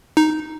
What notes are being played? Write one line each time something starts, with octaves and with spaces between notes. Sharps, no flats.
D#4